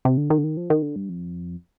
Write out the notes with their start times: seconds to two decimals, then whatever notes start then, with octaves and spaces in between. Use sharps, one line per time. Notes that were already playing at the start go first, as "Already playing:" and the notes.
0.05 C3
0.17 D3
0.30 D#3
0.38 D3
0.44 D#3
0.57 F3
0.70 D#3
0.82 D3
0.96 G2
1.09 F2